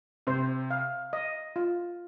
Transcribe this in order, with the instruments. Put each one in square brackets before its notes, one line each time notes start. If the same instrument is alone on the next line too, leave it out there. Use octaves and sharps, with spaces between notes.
[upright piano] C3 [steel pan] C5
[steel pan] F5
D#5
F4